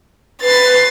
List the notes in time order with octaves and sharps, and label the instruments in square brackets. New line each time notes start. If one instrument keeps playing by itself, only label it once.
[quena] B4 [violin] A6 C7